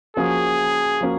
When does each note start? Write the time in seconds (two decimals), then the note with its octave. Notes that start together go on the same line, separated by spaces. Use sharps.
0.17 F3 A#3 C#4 F#4 G#4
1.01 F3 A#3 C#4 F#4